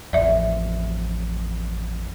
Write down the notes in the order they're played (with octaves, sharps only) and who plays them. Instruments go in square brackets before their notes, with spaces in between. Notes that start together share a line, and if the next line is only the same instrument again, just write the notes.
[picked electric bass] A1 F2 [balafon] D5 E5